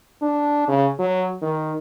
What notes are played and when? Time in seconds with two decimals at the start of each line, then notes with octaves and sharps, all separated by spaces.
0.22 D4
0.68 C#3
0.99 F#3
1.42 D#3